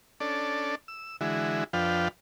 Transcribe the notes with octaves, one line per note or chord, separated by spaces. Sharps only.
C#4 D4 A4 D5
E6
D3 E3 G#3 E4 F#4
F2 F3 D4 B4 F5 G5